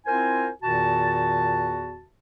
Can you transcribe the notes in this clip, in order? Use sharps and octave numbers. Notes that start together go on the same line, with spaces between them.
C4 E4 F4 A#4 C5 G#5
E2 A#2 D#3 F#4 A5